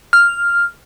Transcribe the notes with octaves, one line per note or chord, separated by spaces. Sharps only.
F6